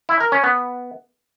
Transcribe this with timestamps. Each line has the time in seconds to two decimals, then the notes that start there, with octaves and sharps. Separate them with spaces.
0.09 E4
0.20 A#4
0.32 C#4
0.44 B3